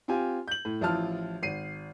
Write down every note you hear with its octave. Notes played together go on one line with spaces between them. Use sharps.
C4 F4 G4 G#5
G6 F#7
A2
A1 F3 E4 F4 A5 F6
G#1 C7 D#7